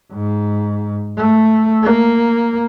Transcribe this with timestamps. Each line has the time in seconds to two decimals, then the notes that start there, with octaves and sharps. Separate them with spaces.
0.12 G#2
1.17 A3
1.83 A#3